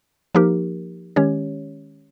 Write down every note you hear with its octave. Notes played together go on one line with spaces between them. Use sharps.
F3 A#3 D#4 G4 A#4
D#3 G#3 C#4 G4 C#5